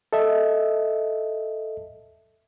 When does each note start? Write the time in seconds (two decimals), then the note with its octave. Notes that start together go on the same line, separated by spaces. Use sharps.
0.13 A4 D#5 E5